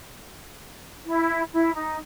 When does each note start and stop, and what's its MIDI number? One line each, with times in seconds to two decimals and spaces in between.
1.06 1.43 64
1.53 1.73 64
1.74 1.98 63